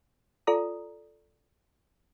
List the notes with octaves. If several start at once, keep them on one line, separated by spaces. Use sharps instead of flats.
F4 A4 D5 A#5 D#6